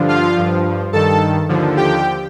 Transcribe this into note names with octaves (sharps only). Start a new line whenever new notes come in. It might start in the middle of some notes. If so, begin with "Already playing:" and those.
Already playing: G2 D3 F3
F4 F5
G2 F3
G2 D#3 A4 A5
D#2 D3 F3
G4 G5